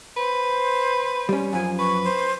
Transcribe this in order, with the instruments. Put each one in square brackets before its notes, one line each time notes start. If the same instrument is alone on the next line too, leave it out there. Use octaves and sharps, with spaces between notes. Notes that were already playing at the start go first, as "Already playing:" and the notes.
[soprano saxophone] B4 [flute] C5
[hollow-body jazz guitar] G3 C#4
[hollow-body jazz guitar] F#2 F3 [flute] G#5
[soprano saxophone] B4 [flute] C#6
[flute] C5